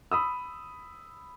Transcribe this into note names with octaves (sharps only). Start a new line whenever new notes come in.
B5 D#6 E6